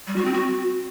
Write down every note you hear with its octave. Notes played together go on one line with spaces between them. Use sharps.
G3
F#4
C4
F#4